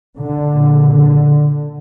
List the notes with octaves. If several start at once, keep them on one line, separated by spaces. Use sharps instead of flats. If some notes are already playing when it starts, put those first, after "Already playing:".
D3
A#2
D3